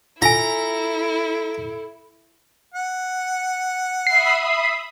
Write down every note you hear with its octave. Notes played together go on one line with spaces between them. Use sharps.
E4 F4 A4 G#5 A#5
F#5
E5 B5 D#6 C7